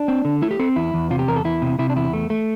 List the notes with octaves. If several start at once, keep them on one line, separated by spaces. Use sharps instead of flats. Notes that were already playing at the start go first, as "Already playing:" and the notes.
Already playing: D4
C4
D3
A3 E4
G4
C4 A4
E2 E4
E2
C3 F4
G4
E2 A#4
A4
E2 E4
C3
C3 E4
D4
E2 E4
A3
A3